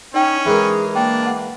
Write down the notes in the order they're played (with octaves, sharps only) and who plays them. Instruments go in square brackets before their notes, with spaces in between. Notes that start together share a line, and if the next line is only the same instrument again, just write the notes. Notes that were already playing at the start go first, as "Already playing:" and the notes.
[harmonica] C#4 [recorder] D#4 [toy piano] D5 G5
[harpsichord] E3 G#3 A#4 [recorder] G#4
[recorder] A#3 [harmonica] D4 [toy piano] G5
[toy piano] F#5 A5